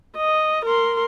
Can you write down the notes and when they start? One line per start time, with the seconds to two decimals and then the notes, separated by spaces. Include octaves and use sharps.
0.17 D#5
0.65 A#4 C6